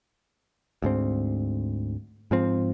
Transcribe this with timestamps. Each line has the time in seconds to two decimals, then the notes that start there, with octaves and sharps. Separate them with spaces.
0.82 D2 G#2 C4
2.31 G#2 F3 C4